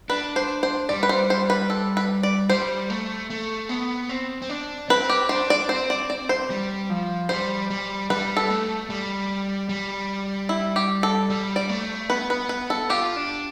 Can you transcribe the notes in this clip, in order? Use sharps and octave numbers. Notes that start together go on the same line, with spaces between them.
D4 B4
C5
C5
G3 D5
B4
C5
C5
B4
A4
B4
D5
G3 C5
A3
A3
B3
C4
C4
D4
C4 B4
G4
D4 C5
D5
C4 C5
D5
D5
C5
G3
F3
G3 C5
G3
G3 B4
A4
A3
G3
G3
E4
G4
A4
G3
D5
A3
B3 B4
B4
B4
A4
F4 G4
D4